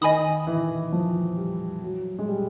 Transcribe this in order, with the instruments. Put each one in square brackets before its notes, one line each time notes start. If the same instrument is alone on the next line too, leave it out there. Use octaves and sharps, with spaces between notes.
[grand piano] D#3 [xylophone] D#5 G#5 B5 D#6
[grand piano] E3
F3
G3
F#3
G#3
G3